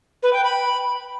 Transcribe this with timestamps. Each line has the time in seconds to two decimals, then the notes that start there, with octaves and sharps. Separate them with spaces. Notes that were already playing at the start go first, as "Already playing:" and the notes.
0.23 B4
0.33 G5
0.44 B5